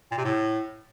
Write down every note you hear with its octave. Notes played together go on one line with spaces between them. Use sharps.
A#2
C3
A2